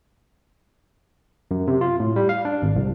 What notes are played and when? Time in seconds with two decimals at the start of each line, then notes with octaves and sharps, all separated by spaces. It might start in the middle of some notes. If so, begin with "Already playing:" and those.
1.51 F#2
1.67 C3
1.81 F4
2.00 A2
2.16 G3
2.29 F5
2.45 D4
2.62 G#1
2.76 C2